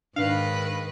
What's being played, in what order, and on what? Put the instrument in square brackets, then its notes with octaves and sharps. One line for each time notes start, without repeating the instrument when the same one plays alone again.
[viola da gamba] G#2 D#3 B4 [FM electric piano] D4 [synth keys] F5